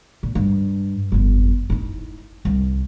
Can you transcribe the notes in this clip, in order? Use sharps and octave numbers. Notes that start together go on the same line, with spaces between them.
A#2
G2
G1 F2
D#4 E4
C2